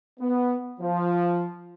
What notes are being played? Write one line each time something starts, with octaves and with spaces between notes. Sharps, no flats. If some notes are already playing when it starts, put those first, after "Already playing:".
B3
F3